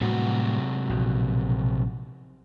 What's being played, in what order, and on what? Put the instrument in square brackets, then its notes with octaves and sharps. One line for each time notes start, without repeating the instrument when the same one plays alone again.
[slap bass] A2 G3 [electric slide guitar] C3 F#3 F#4
[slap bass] A#1 B2